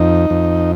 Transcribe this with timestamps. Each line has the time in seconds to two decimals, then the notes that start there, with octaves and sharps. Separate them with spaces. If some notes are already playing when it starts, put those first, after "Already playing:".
Already playing: F2 D#4
0.30 F2